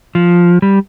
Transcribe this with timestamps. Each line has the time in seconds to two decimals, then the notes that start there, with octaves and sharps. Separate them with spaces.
0.15 F3
0.62 G3